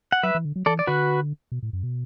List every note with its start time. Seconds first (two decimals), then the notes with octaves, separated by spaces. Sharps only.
0.12 F#5
0.23 F#3 B4 E5
0.35 E3
0.45 D3
0.56 F#3
0.66 E3 A4 D5
0.79 D5
0.87 D3 F#4 B4
1.52 B2
1.63 A2
1.73 F#2
1.83 B2